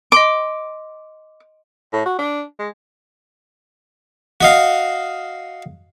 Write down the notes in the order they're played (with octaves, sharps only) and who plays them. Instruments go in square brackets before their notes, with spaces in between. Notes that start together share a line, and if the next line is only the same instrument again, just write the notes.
[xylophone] D#5 C6 D7 [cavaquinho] D6
[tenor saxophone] A2
F#4
D4
G#3
[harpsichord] F#4 D#5 F5